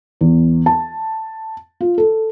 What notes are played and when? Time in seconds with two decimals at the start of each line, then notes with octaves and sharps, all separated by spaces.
0.21 E2
0.66 A5
1.81 F4
1.98 A4